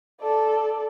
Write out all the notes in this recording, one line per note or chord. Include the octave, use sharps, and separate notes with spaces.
A4 D5